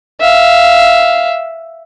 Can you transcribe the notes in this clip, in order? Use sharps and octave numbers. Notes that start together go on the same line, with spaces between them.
E5 F5